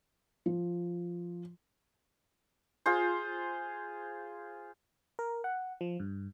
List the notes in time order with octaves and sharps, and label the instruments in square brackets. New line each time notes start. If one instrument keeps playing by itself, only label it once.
[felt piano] F3
[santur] F4 G#4 C5
[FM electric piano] A#4
F#5
F3
G2